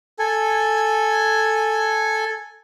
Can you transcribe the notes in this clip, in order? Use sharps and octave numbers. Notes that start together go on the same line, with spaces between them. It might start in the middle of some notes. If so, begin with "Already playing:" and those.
A4 G#5